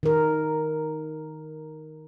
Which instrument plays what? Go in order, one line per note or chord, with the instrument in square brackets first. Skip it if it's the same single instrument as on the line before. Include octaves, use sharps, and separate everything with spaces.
[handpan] D#3 A#4